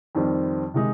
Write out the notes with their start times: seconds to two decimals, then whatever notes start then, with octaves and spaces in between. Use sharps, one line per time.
0.15 F2 D#3 G3 C4
0.74 C3 D#3 G#3 D#4